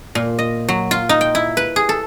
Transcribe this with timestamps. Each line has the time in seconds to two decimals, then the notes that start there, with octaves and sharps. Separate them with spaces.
0.15 A#2
0.39 D#5
0.69 F#3
0.91 F4
1.09 D#4
1.21 G5
1.35 E4
1.57 B4
1.76 G#4
1.89 A4